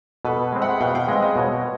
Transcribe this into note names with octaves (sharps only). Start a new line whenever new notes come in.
B2 A4 B4
G#3 C4
E5 F#5
B2 F5 G5
F5 G5
G#3 C4 D#5 F5
D#5 F5
B2 C#5 D#5